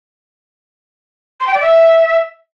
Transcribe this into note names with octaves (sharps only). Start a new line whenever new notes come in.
C6
G5
D5
E5